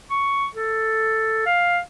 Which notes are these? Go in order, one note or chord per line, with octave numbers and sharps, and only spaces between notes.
C#6
A4
F5